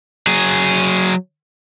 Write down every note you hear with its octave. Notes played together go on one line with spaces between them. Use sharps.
F#3 G#4